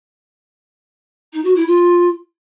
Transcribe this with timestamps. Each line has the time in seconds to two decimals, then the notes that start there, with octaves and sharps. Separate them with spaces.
1.32 D#4
1.44 F#4
1.55 E4
1.67 F4